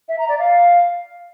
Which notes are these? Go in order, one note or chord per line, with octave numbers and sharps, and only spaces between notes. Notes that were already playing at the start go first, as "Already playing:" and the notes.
E5
A#5
D5
F5